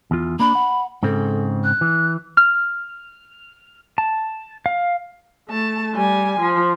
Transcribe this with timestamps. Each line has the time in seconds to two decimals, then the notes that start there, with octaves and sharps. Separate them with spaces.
0.11 E2 F4
0.39 A#3 D4 B5
0.55 F#5
1.03 G#2 C#3 C4 A4
1.64 F#6
1.81 E3
2.37 F6
3.98 A5
4.66 F5
5.49 A3 A5
5.95 G3 G#5
6.41 F3